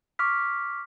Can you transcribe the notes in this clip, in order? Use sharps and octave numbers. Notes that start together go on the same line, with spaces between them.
C#6 D6 F6 B6